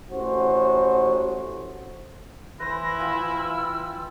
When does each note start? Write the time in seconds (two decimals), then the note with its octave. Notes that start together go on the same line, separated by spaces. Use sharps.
0.10 A1 F#4 C5
2.60 E3 E4 B4 C5 A#6
2.99 F4 G5 G#5 E6